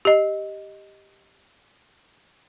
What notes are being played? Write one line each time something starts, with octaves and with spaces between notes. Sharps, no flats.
G4 D#5